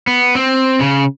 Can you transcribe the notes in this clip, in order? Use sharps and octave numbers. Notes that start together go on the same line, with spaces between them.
B3
C4
C#3